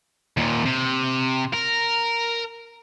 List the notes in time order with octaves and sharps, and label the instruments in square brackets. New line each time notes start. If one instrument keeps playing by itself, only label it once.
[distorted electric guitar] D#2 A#2
C3
A#4